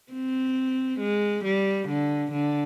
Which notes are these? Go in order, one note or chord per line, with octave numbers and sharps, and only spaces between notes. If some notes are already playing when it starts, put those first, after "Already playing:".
C4
G#3
G3
D3
D3